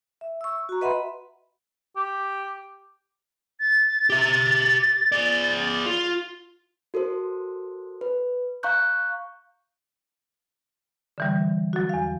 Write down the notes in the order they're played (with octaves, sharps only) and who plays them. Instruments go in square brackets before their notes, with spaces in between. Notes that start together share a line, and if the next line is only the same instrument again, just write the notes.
[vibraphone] E5
C#6 E6
F#4 A#5
B4 D#5 E5 F#5 B5 C6
[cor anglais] G4
[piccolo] A6
[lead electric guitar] G4 E5
G#4 D5
F4
[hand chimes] F#4 A4 A#4 C5
B4
F5 A#5 C#6 F#6 G6
[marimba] D3 E3 G3
F#3 F#4
E2 F5